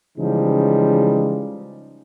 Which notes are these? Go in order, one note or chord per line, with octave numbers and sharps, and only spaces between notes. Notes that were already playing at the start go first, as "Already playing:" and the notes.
C#3 E3 F3 G3 G#3 D#4